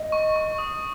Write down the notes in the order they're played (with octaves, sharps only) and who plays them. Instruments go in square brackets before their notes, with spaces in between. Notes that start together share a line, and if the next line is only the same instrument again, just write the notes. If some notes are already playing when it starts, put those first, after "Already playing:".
Already playing: [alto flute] D#5
[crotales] C#6
C#6
D#6